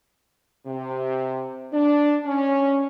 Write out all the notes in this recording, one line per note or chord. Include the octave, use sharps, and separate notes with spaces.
C3
D4
C#4